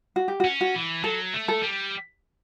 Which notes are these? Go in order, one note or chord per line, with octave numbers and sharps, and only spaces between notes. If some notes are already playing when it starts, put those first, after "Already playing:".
F#4
G4
F#4
C#4
F#4
E3
F#3 A4
A3
A4
G3